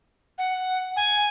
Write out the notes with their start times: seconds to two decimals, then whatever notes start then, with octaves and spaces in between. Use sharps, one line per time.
0.38 F#5
0.96 G#5